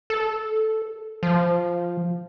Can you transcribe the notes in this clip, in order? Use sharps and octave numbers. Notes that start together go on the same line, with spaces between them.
A4
F3